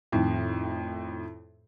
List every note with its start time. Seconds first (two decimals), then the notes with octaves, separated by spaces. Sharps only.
0.12 F2 A2 D#3